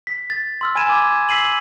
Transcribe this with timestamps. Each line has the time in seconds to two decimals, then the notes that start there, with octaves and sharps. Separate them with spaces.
0.07 B6
0.30 A6
0.61 C6 E6 F6
0.75 G#5 B5 G#6 D#7 E7
0.89 D6 G#6
1.29 E6 B6 C7 D#7 F#7